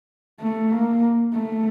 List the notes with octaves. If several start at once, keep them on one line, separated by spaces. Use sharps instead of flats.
A3
A#3
A3